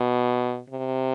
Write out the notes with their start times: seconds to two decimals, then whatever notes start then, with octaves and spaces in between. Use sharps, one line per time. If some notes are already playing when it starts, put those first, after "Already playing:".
Already playing: B2
0.70 C3